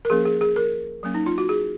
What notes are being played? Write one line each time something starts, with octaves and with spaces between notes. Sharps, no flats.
A#4
F3 A#3 C#4 G#4
G#4
G#4
A#4
F#3 A#3 C#4
D#4
F4
F#4
G#4